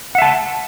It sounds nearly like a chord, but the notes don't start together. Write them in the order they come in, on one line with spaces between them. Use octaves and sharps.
F#5 E5 A5